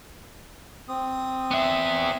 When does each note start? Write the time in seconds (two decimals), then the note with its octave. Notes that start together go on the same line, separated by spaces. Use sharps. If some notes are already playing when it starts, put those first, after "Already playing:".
0.89 C4 D#6
1.51 B3 E5